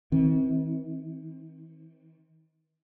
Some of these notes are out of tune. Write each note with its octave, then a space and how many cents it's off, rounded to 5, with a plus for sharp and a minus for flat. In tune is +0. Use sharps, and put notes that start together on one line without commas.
E3 -45 C4 +10